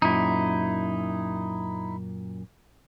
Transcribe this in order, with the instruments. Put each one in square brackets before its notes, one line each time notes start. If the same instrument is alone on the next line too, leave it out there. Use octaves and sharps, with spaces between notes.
[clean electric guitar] F#2 A#2 [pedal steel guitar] D#4 E4